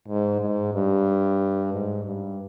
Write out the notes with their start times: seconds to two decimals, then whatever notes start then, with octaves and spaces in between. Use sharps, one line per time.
0.08 G#2
0.41 G#2
0.74 G2
1.73 G#2
2.05 G2